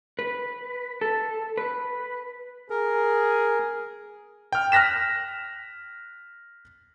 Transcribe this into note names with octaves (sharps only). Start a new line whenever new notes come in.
B4
A4
B4
G#4 A#4
G5 F6
F6 F#6 A#6 B6 E7